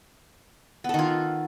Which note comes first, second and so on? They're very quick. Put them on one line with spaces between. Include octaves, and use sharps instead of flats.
B3 A4 D#3 F4